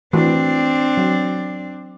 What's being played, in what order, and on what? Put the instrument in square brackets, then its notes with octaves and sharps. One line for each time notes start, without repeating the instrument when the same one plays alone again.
[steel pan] E3 A3 F#4 [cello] C4 D4
[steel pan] F#3